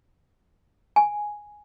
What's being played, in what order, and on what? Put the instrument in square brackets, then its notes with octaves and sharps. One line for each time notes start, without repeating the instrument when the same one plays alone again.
[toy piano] G#5